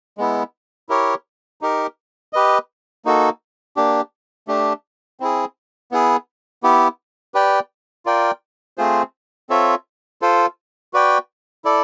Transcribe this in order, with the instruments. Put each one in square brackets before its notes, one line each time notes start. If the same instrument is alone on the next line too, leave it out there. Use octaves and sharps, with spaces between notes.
[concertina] G#3 B3 E4
E4 G4 A#4 C#5
D#4 G4 A#4
G4 B4 D#5
A#3 D#4 F#4 A4
A#3 D4 G4
A3 D4 G4
C4 E4 G#4
B3 E4 G#4
B3 E4 G4
G4 B4 D5 G5
F4 A#4 D5 G5
A3 C4 F4 G#4 C5
C4 F4 A4 C#5 E5
F4 A4 C5
F#4 B4 D5 G5
E4 A4 D5